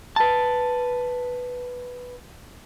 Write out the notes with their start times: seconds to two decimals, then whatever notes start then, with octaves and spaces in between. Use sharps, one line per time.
0.16 B4 A5